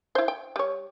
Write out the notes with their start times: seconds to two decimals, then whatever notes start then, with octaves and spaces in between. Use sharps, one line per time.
0.15 E4 C5
0.28 G5
0.56 G3 C#5